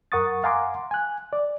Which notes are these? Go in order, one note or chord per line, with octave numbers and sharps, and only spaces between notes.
F#2 A#4 F#5 C#6 D#6 A6
F5 F#5 G#5 A#5 C6 D6
G#5 F#6
D5